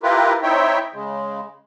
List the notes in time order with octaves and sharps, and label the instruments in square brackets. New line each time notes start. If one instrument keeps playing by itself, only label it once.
[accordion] E4 F4 G4 A#4 B4
C4 D#4 E4 C#5 E5 G5
C#3 G#3